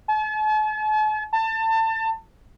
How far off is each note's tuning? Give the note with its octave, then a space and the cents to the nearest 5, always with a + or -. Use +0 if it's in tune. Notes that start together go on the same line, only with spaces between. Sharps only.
A5 -45
A5 +25